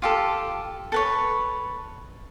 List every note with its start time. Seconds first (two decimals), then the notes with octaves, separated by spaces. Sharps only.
0.02 F4 G4 A4
0.92 A4 B4 C#5